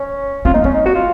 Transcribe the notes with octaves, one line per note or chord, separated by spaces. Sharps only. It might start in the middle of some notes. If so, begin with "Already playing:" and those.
Already playing: C#4
C4 F4
A#3 D#4
C4 C#4
D#4
F#4
F4